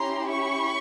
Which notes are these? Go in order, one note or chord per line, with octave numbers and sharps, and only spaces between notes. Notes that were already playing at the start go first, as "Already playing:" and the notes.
Already playing: C#4 E4 G4 A#5 C6
B5 C#6